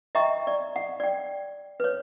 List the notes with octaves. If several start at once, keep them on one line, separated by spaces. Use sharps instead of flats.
D#5 E5 G5 A#5 C#6
D5
F#5
D5 G5
B4 C#5